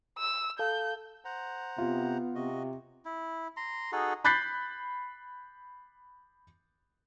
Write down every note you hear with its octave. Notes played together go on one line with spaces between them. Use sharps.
E6
A4 F5 A5 G6
C5 F#5 A#5
C3 B3 F4
C3 F#4 D#5
E4
A#5 C6
D#4 F#4 G#4 A4
B5 F#6 G6 A6 B6 C7